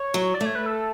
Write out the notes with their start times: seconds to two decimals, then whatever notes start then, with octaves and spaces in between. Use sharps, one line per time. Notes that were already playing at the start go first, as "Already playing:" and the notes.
Already playing: C#5
0.14 F#3
0.34 D5
0.41 A3 C#5
0.55 B4
0.66 A4